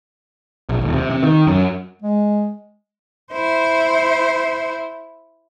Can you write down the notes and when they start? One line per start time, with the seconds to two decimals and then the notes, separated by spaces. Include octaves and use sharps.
0.69 A#1
0.81 D#1
0.94 C3
1.10 C3
1.24 D#3
1.47 F#2
2.02 G#3
3.33 E4 C5